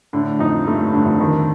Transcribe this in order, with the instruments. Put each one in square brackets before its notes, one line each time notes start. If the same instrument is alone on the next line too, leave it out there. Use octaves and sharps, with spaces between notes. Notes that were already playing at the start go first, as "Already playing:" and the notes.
[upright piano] A2 [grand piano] D3
[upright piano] F2 [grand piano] D#4
[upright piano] G2 [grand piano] A3
[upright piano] A2
[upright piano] G2 [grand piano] D3
[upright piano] F2
[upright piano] F2 [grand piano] D#3